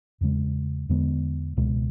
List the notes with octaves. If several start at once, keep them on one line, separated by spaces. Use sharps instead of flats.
E2 C#3 G#3
E2 D3 G#3 B3
C#2 B2 G#3